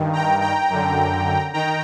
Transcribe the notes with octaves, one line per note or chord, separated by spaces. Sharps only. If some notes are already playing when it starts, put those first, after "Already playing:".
Already playing: G2 D#3
G5 A#5
G5 A#5
F#2 D3
D#3 G5 A#5